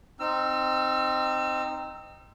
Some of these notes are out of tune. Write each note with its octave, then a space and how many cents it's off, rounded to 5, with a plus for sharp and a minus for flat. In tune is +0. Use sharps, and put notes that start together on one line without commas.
C4 +0 D#4 -10 E6 +35